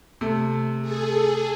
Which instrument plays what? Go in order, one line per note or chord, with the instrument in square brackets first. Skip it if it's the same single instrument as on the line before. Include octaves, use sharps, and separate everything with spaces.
[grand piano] C3 A3
[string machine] G#4 A4